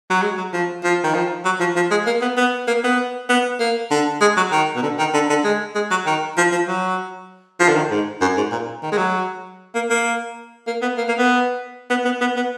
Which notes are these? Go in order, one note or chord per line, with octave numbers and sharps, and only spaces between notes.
F#3
G#3
F#3
F3
F3
D#3
F3
F#3
F3
F3
G#3
A#3
B3
B3
A#3
B3
B3
A#3
D3
G#3
F#3
D#3
B2
D3
D#3
D3
D3
G#3
G#3
F#3
D#3
F3
F3
F#3
F3
D3
D#3
G#2
F#2
G#2
A#2
D#3
G#3
F#3
A#3
A#3
A#3
B3
A#3
A#3
B3
B3
B3
B3
B3